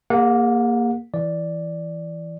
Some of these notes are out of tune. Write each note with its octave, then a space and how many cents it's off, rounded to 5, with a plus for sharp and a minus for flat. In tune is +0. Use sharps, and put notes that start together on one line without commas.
A#3 +0 G#4 -40 F#5 -40
E3 +0 D5 +0